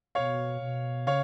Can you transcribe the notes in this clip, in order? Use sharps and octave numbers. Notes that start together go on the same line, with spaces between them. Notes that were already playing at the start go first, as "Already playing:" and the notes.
B2 C#5 F5
B2
C#3 C#5 F5